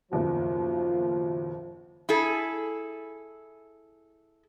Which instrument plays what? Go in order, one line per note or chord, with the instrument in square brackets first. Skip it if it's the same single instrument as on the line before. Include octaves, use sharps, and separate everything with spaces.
[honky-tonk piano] F#1 D#2 B2 [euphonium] F3 [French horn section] F4
[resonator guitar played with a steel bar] E4 G#4 A4